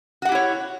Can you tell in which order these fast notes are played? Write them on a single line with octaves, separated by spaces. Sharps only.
F#4 F#5 G4 E4 C#5